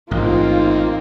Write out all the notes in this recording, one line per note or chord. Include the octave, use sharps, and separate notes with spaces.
A1 G#2 A#3 C4 D#4 F4